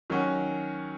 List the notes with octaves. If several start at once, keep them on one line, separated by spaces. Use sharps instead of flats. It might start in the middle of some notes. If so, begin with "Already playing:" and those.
D#3 F#3 C#4 F#4